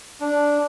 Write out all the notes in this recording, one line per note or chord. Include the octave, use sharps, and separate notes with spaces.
D4